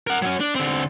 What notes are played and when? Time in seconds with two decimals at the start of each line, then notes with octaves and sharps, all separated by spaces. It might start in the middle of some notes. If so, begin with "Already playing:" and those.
0.07 A#4 F#5
0.22 F#3 C#4
0.40 D4
0.55 D3 C4